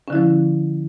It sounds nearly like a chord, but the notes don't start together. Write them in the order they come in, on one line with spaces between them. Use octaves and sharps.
C#4 D3 E4 F3